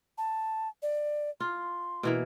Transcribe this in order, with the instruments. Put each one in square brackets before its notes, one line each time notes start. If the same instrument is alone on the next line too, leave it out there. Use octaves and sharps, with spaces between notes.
[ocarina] A5
D5
[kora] F4 [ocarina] C6
[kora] B2 E3 A#3